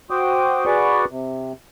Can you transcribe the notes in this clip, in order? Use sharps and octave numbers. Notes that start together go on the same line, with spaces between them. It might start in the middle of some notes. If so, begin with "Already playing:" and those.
F#4 C5 G5 D6 D#6
F#4 G#4 B4 D5 C#6 D6
C3